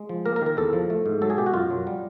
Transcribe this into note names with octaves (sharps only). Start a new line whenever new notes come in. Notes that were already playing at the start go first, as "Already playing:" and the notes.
Already playing: G#3
F3
A#3 A#4
A#4
D#3
A#4
E2 A4
F3
A3
G#2
F#3 A4
G#4
B2 G4
F#4
F#2 F4
F#3
G3